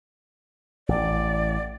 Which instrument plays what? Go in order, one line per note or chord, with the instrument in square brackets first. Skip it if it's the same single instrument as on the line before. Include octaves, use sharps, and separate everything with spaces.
[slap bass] A1 [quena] D5